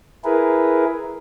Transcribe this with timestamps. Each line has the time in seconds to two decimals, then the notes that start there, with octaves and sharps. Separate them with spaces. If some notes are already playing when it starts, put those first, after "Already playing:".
0.24 E4 G#4 A#4 B4